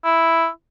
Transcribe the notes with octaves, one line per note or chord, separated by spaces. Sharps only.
E4